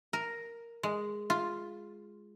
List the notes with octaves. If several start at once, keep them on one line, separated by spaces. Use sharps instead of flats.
A#4
G#3
F4